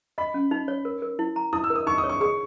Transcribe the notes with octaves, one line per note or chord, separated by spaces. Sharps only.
D#5 B5
C#4
D#4
C#5
A#4
A#4
E4
A#5
E4 D#6
E6
A#4
D#6
D#4 C#6
D#6
C#5
C#6
G#4 C#6